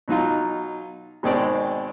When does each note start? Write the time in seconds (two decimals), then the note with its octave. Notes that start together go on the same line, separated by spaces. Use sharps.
0.08 B2 F#3 D#4 F4
1.23 G#1 B2 D#3 G#3 C4 D5